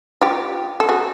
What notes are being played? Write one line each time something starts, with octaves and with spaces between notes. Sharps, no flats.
F4 G4
A4
F#4 G#4